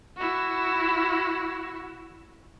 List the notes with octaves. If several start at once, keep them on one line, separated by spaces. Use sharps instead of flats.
E4 F#4